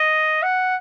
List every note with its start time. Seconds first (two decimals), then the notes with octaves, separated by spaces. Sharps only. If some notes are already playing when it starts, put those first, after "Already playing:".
Already playing: D#5
0.43 F#5